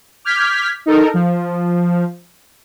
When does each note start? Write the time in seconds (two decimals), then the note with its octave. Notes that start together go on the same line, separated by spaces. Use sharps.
0.25 D6 F6 G6 G#6 B6
0.86 D#4 A4 A#4
1.14 F3